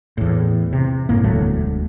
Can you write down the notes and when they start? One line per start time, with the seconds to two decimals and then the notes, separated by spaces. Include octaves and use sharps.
0.18 E2 A2
0.73 C3
1.09 F#1 A2 A#3
1.24 E1 D2 F#3 A3